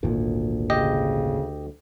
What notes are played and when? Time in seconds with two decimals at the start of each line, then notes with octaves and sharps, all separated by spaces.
0.03 G#1 D2 A#2
0.70 C#3 G4 D#5